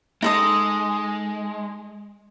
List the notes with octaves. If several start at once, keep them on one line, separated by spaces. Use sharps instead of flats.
G#3 D#4 A4 D#5